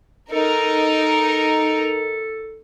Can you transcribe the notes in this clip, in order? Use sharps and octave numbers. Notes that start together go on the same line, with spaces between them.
D#4 A4 A#4